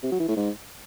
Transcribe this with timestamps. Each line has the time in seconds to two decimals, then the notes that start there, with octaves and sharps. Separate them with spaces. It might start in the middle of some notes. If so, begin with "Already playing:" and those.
0.03 C3
0.12 F#3
0.20 E3
0.28 A2
0.36 G#2